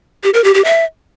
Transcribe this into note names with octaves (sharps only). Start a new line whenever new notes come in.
G4
A#4
G4
G4
E5